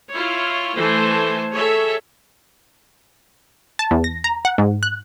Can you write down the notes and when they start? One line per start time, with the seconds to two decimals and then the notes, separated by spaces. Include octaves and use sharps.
0.13 E4 F4 C#5
0.75 E3 A3 A4 C5 G#5 A5
1.54 G#4 A4 C#5 E5
3.79 A5
3.91 E2
4.04 A#6
4.24 A#5
4.45 F#5
4.58 G#2
4.83 F#6